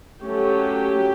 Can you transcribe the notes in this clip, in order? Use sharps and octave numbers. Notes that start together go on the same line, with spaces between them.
F#3 A3 C#4 G4